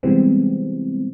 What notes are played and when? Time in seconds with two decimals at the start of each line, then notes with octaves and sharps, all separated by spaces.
0.03 C3 E3 G3 G#3 B3 C4